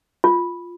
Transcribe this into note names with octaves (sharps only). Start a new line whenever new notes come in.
F4